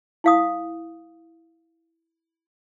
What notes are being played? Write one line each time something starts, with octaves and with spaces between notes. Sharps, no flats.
E4 F5 D#6